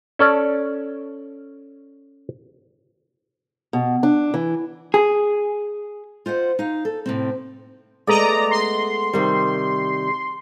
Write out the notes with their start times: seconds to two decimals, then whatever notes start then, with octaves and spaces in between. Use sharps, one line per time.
0.19 C#4 A4 D5
3.73 B2
4.03 D4
4.34 E3
4.94 G#4
6.26 F4 C5 D#5 F#5
6.59 D#4 F5
6.85 A4
7.06 A2 C3 C4
8.07 G#3 A3 B3 D5 D#5 A#5
8.51 C6
9.13 C3 D#3 G3